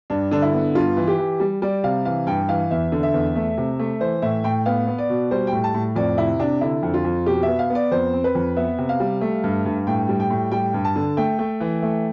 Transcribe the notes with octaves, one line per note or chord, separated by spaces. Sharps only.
G2 D4
D3 D4
E4
B3
G2 F4
E3
G4
E3
G3
G3 D5
C3 F5
E3 F5
G2 G5
E3 F5
E2 E5
D3
E5
E2
A3
C3
A3
E3 C5
A2 E5
A2 G5
B3 F5
B3
D5
B2
G3 C5
G5
A2
A5
A2
F2 D5
C3 E4
C3 D4
D3 E4
F2
F4
F2
B2 G4
E5
B3
F5
B3
D5
F2 C5
C4
B4
F2
B3 E5
C3
F5
G3
A3
G2
G2
A2 G5
G3
G5
A2
G3 G5
G2
A5
D3
A3 G5
A3
E3
A3